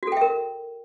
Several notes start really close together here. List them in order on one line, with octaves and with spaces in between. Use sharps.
F#4 A4 G5 E5 A#4